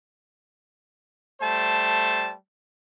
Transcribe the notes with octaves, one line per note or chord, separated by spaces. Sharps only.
G3 A3 C5 A5